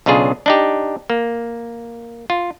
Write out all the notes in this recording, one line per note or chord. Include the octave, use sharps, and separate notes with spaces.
B1 C#3 D4 F4 G#4
D4 D#4 G4
A#3
F4